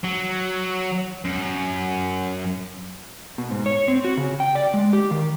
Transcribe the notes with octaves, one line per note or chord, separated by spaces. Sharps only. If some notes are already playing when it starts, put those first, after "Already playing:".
F#3
F#2
B2
G#2
C#5
C4
F#4
C#3
G5
D5
G#3
G4
D#3